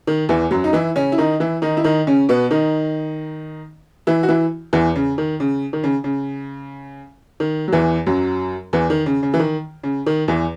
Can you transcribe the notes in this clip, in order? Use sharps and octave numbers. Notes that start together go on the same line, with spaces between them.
D#3
E2 E3
F#2 F#3
D#4
E3 E4
C#3 C#4
E4
D#3 D#4
E3 E4
D#3 D#4
E4
D#3 D#4
C#3 C#4
B2 B3
D#3 D#4
E3 E4
F#4
E3 E4
E2 E3
C#3
D#3
C#3
D#3
C#3
C#3
D#3
F#3
E2 E3
F#2 F#3
E2 E3
D#3
C#3
C#3
E3
D#3
C#3
D#3
E2 E3